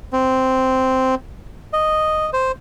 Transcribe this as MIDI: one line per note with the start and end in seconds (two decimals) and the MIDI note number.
0.13 1.15 60
1.73 2.30 75
2.33 2.52 72